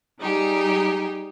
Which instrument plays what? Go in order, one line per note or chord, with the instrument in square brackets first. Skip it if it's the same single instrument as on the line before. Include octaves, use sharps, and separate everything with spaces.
[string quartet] G3 D#4 G4 G#4